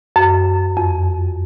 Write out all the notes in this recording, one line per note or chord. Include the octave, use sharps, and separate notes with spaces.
F#2
F2